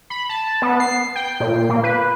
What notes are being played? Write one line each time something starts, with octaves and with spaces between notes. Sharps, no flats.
B5
A5
B3
C7
G5
A#2
A#3
B4